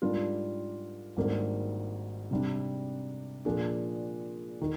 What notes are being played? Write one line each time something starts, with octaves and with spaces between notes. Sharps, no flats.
G#2 G3 D4 F4 A#4
G#1 G#2 G3 A#3 D4
C3 G3 D4
A#2 F3 A#3 D4 G#4
D#3